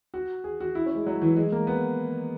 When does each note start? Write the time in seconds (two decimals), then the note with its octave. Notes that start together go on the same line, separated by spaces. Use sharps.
0.14 F#4
0.44 G#4
0.60 F#4
0.75 E4
0.86 C#4
0.95 G#3
1.06 F#3
1.22 E3
1.36 G#3
1.52 A#3
1.67 B3